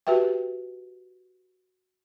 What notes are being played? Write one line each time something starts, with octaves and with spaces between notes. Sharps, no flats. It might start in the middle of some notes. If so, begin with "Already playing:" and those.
F#4 G4 B4 E5 G5